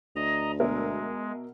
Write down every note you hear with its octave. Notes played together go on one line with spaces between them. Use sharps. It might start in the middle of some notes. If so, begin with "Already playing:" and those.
D2 D#5 A#5
B2 G#3 A#4 E5